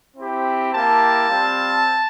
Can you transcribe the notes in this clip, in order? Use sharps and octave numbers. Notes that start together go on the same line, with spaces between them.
C4 E4 G4
A#3 E4 G4 A5
G3 C4 F4